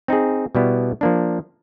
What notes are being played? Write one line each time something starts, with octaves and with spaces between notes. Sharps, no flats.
C4 D#4 G#4
B2 G3 B3 E4
F3 A#3 D4